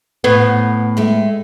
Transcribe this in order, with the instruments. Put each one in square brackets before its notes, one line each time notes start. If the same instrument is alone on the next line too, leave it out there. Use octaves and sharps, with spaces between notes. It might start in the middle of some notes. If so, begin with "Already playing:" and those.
[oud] A2 B3
[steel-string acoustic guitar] G#3 A3